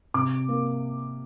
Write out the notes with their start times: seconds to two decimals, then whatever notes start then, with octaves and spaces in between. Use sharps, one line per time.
0.14 C3 D6
0.49 A#3